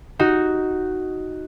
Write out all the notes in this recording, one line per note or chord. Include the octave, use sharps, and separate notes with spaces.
D#4 F#4